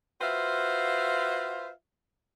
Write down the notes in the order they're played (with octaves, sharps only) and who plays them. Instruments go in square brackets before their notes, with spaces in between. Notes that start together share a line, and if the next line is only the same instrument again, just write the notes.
[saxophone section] F4 F#4 B4 C5 E5 F5